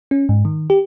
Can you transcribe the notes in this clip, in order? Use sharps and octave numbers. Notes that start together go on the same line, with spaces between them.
C#4
G#2
D#3
G4